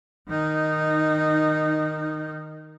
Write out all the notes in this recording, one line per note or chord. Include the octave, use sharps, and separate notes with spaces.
D#3 D#4